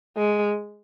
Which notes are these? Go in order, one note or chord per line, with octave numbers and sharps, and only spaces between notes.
G#3